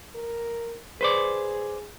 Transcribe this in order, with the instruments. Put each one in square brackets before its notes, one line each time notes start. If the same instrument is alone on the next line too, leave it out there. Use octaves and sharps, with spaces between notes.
[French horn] A#4
[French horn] G#4 [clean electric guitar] B4 C5 D5